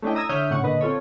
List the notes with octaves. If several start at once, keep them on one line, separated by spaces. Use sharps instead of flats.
A3 C#4 D4 E4 D#5 G5
A#5 D#6 E6 G#6 A#6
D3 C#5 E5 D#6 F6 G6
A2 C#3 F#5 C#6
A#2 D3 B4 D#5
C4 F4 A4 C#5